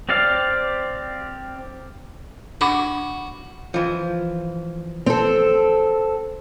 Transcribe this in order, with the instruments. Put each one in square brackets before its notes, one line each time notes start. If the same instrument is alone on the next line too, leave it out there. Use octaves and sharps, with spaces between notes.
[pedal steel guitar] C4 G4 D5 F5
[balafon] D4 B5 D6 [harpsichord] F#4
[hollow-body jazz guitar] E3 F3
[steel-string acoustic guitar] C4 A4